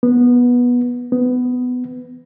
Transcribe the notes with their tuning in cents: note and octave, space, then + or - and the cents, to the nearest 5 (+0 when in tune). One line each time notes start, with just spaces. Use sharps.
B3 -15
B3 +15